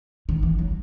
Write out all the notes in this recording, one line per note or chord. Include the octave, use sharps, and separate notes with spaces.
D#3
E3
F#3